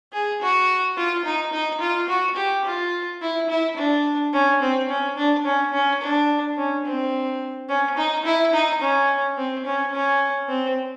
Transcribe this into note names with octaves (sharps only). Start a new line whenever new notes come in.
G#4
F#4
F4
D#4
D#4
F4
F#4
G4
F4
E4
E4
D4
C#4
C4
C#4
D4
C#4
C#4
D4
C#4
C4
C#4
D#4
E4
D#4
C#4
C4
C#4
C#4
C4